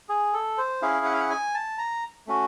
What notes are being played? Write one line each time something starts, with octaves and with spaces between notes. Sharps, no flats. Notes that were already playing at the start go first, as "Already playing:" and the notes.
G#4
A4
C5
C#4 E4 G#4 F5
F#5
F5
F#5
G#5
A5
A#5
A3 C#4 F#4